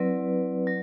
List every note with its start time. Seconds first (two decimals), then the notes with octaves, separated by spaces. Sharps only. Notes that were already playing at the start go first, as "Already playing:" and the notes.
Already playing: F#3 C4 E4 B4 D5
0.67 F#3